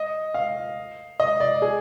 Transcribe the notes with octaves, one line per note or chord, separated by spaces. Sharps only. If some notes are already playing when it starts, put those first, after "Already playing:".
Already playing: D#5
F5
D#5
D5
G#4